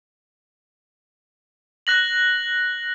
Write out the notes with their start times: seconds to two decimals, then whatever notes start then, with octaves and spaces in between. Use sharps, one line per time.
1.87 F#6 A#6 F#7